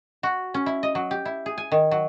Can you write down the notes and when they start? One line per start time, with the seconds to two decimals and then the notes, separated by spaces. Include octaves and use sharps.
0.23 F#4
0.54 C#4
0.66 E4
0.83 D#5
0.95 F#3
1.11 G4
1.25 E4
1.46 G#4
1.58 G#5
1.72 D#3
1.91 F#3